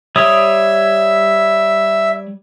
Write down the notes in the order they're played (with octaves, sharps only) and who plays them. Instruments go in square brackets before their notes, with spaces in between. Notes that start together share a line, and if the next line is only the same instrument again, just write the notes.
[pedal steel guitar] G3 C#5 D#6 [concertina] E5